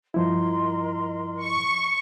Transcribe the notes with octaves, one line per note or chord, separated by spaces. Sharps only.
G2 F3 E4 A#4 D#5 C6
C#6